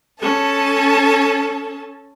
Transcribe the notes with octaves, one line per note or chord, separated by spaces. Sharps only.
C#4 A4 A5